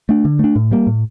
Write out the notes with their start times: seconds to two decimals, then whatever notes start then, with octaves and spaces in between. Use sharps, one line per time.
0.09 A3 D4
0.25 D3
0.39 A3 D4
0.56 A2
0.71 G3 A#3
0.87 A2